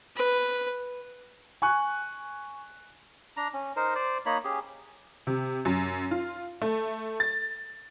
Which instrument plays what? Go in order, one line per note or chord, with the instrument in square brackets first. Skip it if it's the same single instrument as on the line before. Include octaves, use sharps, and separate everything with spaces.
[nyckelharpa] B4
[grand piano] G#5 C#6 F#6
[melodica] D4 A#5
C#4
D#4 A#4 C5
C5 D5
A#3 D#4 C#5 B5
C#4 G4 G#4
[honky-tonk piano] C3
F#2
F4
A3
A6